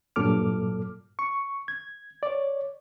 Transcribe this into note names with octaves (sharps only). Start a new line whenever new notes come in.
G2 A#2 F#3 A4 D6 F6
C#6
G#6
C#5 D5